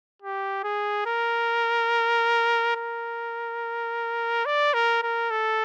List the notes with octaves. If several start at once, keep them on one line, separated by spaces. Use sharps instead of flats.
G4
G#4
A#4
A#4
D5
A#4
A#4
A4